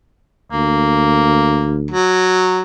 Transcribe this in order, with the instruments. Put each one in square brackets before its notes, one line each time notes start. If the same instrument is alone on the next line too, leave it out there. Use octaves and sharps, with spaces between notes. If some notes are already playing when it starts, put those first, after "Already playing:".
[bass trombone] D2 [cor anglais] A#3
[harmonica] F#3